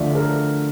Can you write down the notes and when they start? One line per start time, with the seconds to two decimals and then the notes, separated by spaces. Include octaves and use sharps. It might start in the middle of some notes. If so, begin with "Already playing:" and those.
Already playing: D2 D3 F3 A3 D5 E5 F5
0.15 A#4